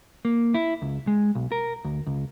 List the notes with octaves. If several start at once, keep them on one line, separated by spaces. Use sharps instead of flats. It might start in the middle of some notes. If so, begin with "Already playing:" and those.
A#3
E4
C#2
G#3
B1
A#4
D2
C#2